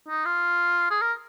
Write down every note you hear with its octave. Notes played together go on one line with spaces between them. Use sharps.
D#4
F4
G#4
A#4